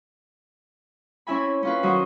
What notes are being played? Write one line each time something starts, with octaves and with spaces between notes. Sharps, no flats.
C4 C#4 E4 E5 G#5 B5
C#4 F4 B4
D#3 F#3 F#4 C5 D#6